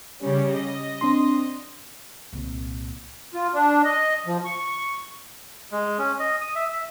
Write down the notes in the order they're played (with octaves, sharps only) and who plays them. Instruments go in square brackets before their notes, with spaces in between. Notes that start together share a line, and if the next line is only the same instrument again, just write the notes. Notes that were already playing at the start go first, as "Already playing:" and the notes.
[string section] C#3 G3 C#4
D#5
[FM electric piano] C4 D4 C6
[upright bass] C2 A#2
[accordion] F4
D4
D#5
F3
C#6
[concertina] G#3
C#4
D#5
D#6
E5
E5